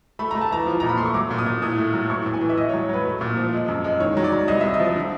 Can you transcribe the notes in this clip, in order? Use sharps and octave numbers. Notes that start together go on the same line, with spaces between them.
A3 B5
A3 A#5
A5
E3 A#5
F3
A#2 A#5
B5
A3 C6
C#6
F#3 D6
A#2
D#6
A#2
A2 D#6
A3
F#3
A2 C#6
A2
G#5
E3
E5
A2 D#5
C#5
F#3
F#3 B4
A3
A#2
F3
G#3
F#2
G#3
D#3 C#5
F#3
D5
F#3
C2 D#5
C2 E5
D#5
F3
D3